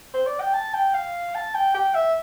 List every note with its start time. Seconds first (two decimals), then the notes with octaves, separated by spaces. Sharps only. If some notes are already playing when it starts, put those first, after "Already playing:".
0.14 C5
0.27 D5
0.40 G5
0.54 A5
0.74 G5
0.94 F5
1.35 A5
1.55 G5
1.74 G5
1.94 E5